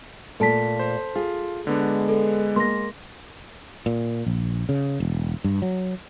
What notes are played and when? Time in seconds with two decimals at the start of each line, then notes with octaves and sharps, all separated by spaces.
0.40 A#2 A3 A4 A5 B6
0.79 C5
1.16 F4 G#4
1.67 D3 G#3 B3 D4
2.09 A4
2.56 A#3 C6 A#6
3.86 A#2
4.26 A#1
4.69 C#3
5.00 E1
5.44 G2
5.62 F#3